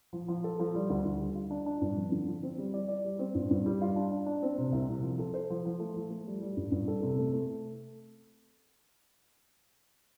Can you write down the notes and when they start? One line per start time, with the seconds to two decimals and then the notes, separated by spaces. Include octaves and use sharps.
0.13 F3
0.28 F3
0.44 A4
0.60 F3
0.75 G3
0.90 D2
1.05 D2
1.20 G3
1.35 F4
1.51 D4
1.66 D4
1.82 G2
1.97 F2
2.12 D3
2.28 F3
2.43 C4
2.58 G3
2.74 D5
2.88 D5
3.05 G3
3.19 C4
3.35 G2
3.51 G2
3.66 G3
3.82 F4
3.96 D4
4.12 D4
4.26 D4
4.43 C4
4.58 C3
4.72 C2
4.89 C3
5.03 F3
5.19 A4
5.34 C5
5.50 F3
5.65 F3
5.80 A3
5.96 F3
6.11 A3
6.27 G3
6.42 G3
6.57 G2
6.72 G2
6.88 A4
7.03 C3
7.19 A3
7.33 A3